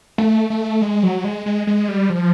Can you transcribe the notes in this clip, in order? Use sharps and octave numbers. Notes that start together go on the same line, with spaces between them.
A3
A3
G#3
F#3
G#3
G#3
G#3
G3
F3